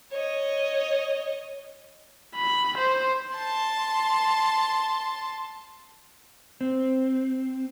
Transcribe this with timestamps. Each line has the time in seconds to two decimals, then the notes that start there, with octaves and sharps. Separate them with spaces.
0.11 C#5 D#5
2.35 B5
2.77 C5
3.35 A5 C6
6.61 C4